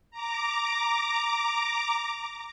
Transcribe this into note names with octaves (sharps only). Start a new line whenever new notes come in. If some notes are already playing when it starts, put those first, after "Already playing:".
A#5 D6